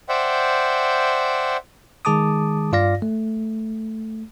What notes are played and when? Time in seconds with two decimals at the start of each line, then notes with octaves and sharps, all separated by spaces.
0.09 C5 D5 E5 F#5 G5
2.05 D#3 G#3 G#4 A5 D6 D#6
2.72 G2 F4 D5 F5 A#6
3.02 A3